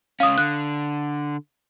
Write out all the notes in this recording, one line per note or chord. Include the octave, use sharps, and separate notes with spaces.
C#2 C#4 F5 D#6
D3 F#6